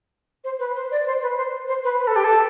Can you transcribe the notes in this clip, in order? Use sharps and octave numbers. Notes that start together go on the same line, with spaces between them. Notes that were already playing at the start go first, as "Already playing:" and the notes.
C5
B4
C5
D5
C5
B4
C5
C5
B4
B4
A4
G4
A4